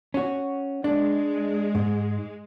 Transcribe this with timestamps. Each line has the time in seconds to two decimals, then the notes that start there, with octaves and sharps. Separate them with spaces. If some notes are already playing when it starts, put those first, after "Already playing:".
0.14 C#4 F#4
0.84 G#3 D4
1.75 G#2